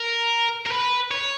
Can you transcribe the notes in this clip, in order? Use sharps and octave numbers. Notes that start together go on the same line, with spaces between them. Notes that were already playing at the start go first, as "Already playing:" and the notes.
Already playing: A#4
A#4
B4
C#5